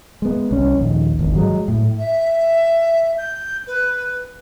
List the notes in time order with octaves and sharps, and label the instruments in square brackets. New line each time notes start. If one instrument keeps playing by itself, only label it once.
[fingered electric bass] G#3 B3
C2 C#4
A#1 D#2
G#1 E2
F#3 G#3
A2
[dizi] E5
G6
B4